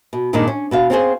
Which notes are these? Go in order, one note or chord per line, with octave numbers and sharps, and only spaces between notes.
B2
G2 A#2 D#3 G#3 D4 D#4
C#4
B2 F#4 F5
C4 C#4 F4 G4 G#4 C5